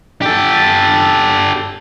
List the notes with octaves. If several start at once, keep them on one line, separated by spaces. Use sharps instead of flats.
G4 A4